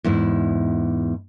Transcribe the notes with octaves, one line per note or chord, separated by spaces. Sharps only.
E2 G#2 E4